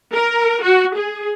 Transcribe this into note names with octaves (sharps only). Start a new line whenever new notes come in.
A#4
F#4
G#4